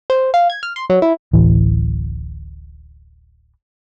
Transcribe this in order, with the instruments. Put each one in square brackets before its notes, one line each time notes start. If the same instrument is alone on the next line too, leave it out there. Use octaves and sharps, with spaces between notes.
[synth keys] C5
F5
G#6
F6
C6
F#3
E4
[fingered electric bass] D1 A1 E3